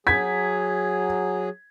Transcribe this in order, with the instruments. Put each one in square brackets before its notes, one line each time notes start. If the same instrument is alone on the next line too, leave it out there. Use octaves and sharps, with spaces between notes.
[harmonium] F#3 G#4 [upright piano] G#6 B6